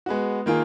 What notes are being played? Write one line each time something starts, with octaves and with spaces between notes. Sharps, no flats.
G#3 B3 F#4
D#3 A#3 F4 G#4